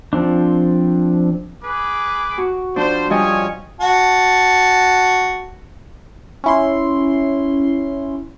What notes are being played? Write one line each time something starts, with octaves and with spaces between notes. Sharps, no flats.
F3 C4 D4
G#4 B4 D6
F#4
F3 G3 D4 C5
F3 G3 C#4 C#5 D#5 G#5
F#4 A5
C#4 E4 C6